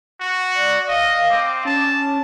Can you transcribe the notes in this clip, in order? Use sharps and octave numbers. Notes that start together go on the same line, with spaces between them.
F#4
D5
D#5 F5
C4 D6
C#4 A5